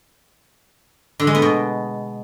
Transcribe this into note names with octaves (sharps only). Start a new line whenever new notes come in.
D3
G#3
B3
B2